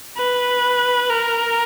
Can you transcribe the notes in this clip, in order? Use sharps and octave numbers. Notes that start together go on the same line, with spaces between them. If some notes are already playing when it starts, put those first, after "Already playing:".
B4
A#4